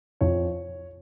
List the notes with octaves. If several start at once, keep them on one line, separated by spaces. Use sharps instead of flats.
F2 F3 C#5